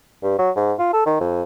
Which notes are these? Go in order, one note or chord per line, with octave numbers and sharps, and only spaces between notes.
G2
F#3
G#2
F4
A4
D#3
F2